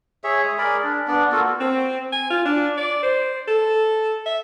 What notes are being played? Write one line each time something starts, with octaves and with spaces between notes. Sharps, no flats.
G#4 C#5 E5
G#3 D#6
G#4 A#4 D5 B5
D4
B3 D4 D5
A#3 F4 F#4 A4
C4
G#5
F4
D4
D5
C5
A4
E5